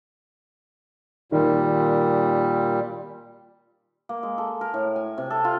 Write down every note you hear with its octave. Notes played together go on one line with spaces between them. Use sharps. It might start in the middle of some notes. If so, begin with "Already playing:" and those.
A#2 D#3 G3
A#3
G#3
A4
A#4
A2
G#5
C3
A4
F4